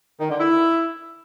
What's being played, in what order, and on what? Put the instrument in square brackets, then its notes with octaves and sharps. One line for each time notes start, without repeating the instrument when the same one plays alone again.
[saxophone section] D#3
D3
E4